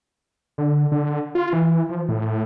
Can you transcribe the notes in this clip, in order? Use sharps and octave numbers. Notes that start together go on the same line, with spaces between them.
D3
D3
F4
E3
F3
A2